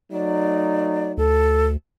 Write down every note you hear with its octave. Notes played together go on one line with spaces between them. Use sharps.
F#3 A3 D#4 D5
D2 A4